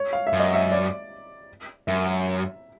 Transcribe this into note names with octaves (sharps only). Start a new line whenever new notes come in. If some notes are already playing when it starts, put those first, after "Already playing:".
Already playing: C#5
F5
E5
F#2
D#5
E5
D5
F#2 E5